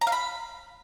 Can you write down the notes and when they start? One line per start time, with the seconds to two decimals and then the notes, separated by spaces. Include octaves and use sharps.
0.01 A#5
0.07 F5
0.12 B5